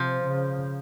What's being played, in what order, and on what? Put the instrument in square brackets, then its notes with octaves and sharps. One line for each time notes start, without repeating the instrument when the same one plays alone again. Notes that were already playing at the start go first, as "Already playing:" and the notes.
Already playing: [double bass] C3 [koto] F3
[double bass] C#3